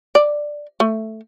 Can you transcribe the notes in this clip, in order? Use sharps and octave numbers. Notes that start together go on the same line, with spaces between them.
D5
A3